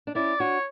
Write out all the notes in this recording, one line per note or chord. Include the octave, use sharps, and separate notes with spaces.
D4
C#4 E4 D5
D4 F#4 C#5